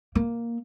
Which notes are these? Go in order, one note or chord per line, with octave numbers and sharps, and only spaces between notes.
A#3